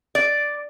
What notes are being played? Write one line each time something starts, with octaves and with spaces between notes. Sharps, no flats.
D5